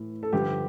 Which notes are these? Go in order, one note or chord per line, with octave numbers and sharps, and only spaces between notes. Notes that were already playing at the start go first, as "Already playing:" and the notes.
Already playing: A2 E3
A4
G2 D3 F3 G4